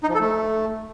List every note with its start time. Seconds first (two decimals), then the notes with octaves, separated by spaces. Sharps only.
0.03 D#4
0.09 F3
0.15 A4
0.21 A3